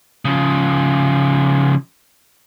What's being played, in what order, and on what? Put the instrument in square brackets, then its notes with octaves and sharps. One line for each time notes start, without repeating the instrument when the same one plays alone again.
[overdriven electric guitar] C#3 F3